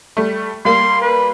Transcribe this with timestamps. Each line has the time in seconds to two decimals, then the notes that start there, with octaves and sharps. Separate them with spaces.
0.17 G3 A3
0.65 G3 A#3 C6
1.01 B4